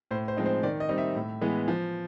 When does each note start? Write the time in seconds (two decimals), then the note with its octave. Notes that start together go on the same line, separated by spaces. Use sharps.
0.11 A2 C5
0.28 C5
0.37 F3 G#3 C4 D#4
0.46 C5
0.63 D#3 D5
0.80 D#5
0.89 G3 C4 D#4
0.98 E5
1.15 A2
1.41 E3 G#3 B3
1.68 F3